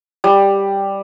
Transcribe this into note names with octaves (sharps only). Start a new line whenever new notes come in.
G3